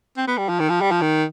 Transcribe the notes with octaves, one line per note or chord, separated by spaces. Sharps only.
C4
B3
G3
F3
D#3
F3
G3
F3
D#3